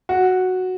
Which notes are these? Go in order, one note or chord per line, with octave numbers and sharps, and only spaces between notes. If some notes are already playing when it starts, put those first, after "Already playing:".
F#4